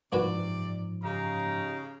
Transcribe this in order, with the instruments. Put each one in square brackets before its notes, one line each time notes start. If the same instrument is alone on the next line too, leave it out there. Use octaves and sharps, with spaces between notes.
[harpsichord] C2 F#4 B4 [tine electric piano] G#2 F3 [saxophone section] C3 D5
[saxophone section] C#3 [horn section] D#4 G4 A#5